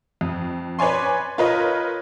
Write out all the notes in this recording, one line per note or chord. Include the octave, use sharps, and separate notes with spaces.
F2
B4 C#5 D5 G#5 C6
F4 A#4 B4 C#5 D#5